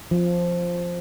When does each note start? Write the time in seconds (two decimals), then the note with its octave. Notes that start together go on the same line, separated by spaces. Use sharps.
0.11 F3